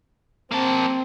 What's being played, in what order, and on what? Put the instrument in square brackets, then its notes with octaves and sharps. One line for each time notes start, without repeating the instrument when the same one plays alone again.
[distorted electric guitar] A#3 A5 [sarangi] C4